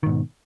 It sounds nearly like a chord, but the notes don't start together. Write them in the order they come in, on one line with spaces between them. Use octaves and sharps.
D#3 G#2 B2